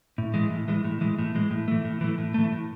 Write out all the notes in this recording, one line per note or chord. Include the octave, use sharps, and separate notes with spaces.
A2
E3 G#3
A2
E3 G#3
A2
E3 G#3
A2
E3 G#3
A2
E3 A3
A2
E3 A3
A2
E3 A3
A2